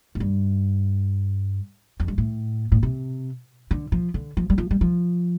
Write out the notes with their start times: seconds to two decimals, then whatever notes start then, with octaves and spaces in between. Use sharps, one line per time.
0.15 A2
0.20 G2
2.00 F2
2.08 G2
2.18 A2
2.72 A2
2.83 C3
3.71 D3
3.92 F3
4.14 D3
4.37 F3
4.50 G3
4.58 F3
4.71 G3
4.81 F3